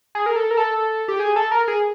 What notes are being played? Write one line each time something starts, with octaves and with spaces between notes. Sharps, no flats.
G#4
A#4
A4
A#4
A4
G4
G#4
A4
A#4
G#4